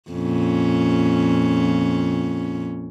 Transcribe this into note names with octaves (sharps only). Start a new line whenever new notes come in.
F2 A#2 C#4